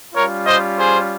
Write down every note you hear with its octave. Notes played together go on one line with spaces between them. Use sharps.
G3 C#4 F4 A#4 C#5
C5 D#5
G#4 C5